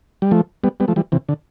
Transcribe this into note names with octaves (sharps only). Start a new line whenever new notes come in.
G3
F3 A3
G3 B3
G3 B3
F3 A3
E3 G3
C3 E3
D3